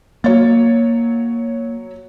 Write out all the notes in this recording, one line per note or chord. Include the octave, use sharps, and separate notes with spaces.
F#3 A#3 C#5 A6